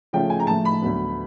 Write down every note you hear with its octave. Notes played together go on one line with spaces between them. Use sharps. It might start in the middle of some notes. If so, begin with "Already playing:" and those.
C#3 F3 A3 C#4 F4 G5
G#5
A#5
A2 F3 A3 A5
B5
D2 D3 F#3 B3